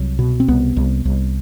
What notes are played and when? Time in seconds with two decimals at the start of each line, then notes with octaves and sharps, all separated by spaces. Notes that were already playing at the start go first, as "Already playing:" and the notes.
Already playing: C2 F#3
0.19 B2
0.40 C4
0.48 C2 B3
0.76 C2
1.05 C2